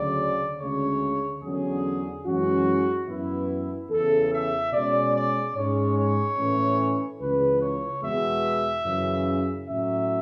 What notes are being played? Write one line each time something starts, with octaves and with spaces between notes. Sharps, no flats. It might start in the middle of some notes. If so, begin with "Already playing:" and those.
Already playing: D2 C#3 F#3 D5
D2 C#3 G#3 C#4 C#5
E2 D3 F#3 C#4 G#4
F#2 E3 G#3 C#4 F#4
F#2 E3 B3 E4
E2 C#3 E3 A4
E5
B2 G#3 C#4 D5
D5
G#2 G#3 C#4 C#5
C#5
A2 E3 A3 C#4
C#2 C#3 E3 B4
C#5
E2 B2 G#3 B3 E5
F#2 C#3 E3
A2 F#3 C#4 E5